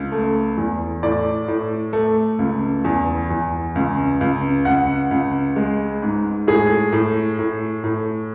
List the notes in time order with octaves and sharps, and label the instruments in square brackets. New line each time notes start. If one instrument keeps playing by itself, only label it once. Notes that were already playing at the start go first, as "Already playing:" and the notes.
Already playing: [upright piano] C#2
A3
E2
A2 D5
A2
A3
C#2
E2
E2
C#2
C#2
C#2 F#5
C#2
G#3
G#2
A2 G#4
A2
A2
A2